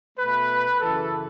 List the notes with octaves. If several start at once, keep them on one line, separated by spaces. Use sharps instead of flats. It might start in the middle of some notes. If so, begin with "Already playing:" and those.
B2 A3 B4
F#2 C#3 E3 A4